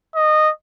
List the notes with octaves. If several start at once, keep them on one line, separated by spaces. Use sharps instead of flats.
D#5